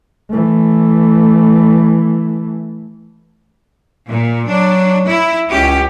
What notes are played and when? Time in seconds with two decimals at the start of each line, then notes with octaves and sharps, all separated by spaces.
0.30 E3 A3
4.09 A#2
4.48 F#3 D4
5.07 E4
5.50 C#2 C#4 G4